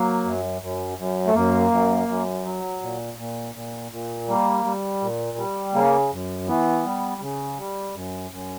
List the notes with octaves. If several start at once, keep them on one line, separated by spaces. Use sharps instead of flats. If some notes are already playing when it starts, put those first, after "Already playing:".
Already playing: F#3 A#3
F#2
F#2
F#2
A3
F#2 A#3
F#2
F#2
F#3
A#2
A#2
A#2
A#2
G3 A#3
G3
A#2
G3
C#3 A#3
F#2
E3 B3
G3
C#3
G3
F#2
F#2